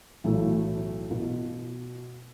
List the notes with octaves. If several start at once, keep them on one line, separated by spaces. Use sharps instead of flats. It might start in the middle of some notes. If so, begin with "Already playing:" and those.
B1 A2 E3 A3 E4
B2